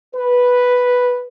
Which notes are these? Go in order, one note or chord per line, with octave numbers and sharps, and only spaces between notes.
B4